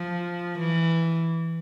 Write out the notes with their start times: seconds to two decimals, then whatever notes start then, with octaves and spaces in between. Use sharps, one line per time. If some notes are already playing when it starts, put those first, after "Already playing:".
Already playing: F3
0.59 E3